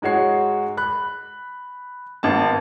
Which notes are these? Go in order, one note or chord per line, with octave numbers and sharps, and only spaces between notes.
G#2 G#3 F#4 C#5 C7
B5 F#6
G#1 B3 A5